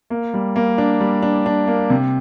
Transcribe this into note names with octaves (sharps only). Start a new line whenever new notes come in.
A#3
G3
A#3
D4
G3
D4
D4
A#3
C3